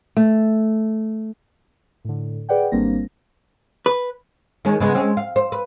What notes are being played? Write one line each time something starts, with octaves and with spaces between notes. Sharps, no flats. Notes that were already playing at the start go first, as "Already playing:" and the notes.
A3
A2 D3
G#4 B4 D5 F#5 G5
G#1 G3 A#3 C4 D4 A#6
B4
D#3 G#3 C#4
C#3 G#3 B3
G#3 C4 C#4
F5
C5
B4